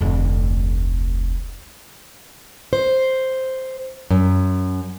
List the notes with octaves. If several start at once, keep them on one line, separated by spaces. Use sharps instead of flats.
F1 D2
C5
F#2